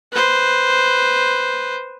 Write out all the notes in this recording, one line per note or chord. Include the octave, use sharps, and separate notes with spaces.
B4 C5